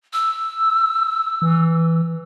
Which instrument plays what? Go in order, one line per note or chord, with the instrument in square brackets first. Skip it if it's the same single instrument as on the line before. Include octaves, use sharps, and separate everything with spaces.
[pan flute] E6
[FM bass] E3